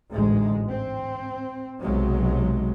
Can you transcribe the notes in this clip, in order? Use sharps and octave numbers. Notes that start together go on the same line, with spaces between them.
A1 D2 G#2 G#3
C4
B1 C3 F#3 G#3